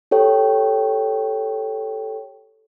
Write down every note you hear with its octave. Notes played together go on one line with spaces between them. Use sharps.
G4 A4 C#5 G5